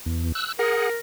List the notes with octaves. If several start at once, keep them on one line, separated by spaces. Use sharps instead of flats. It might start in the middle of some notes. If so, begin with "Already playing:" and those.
E2
E6 F#6
G#4 A#4 F#5